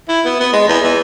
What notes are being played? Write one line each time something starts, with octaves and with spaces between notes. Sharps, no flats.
E4
B3
B3
G#3
E2
E3